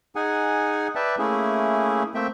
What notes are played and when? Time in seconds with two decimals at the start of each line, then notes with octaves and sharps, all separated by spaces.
0.16 D#4 G#4 F#5 G#5
0.95 B4 D5 E5 G5 A5
1.19 A3 A#3 C#4 E4 G#4
2.15 A3 A#3 C4 E5 G5